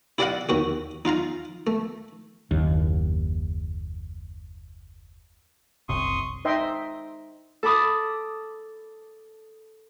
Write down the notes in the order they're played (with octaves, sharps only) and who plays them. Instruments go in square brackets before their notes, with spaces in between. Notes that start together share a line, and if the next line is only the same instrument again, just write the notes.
[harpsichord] E4 G4 D5 D#5 F5 F#5
D#2 F#4 G4
D#4 F4 F5 A#5
A3
[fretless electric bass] F#1 D#2
[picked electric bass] F#1 C2 C3 [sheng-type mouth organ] C6 C#6 D#6
[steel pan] D#4 C5 D#5 E5 G5 C6
[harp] A4 A5 B5 D6 D#6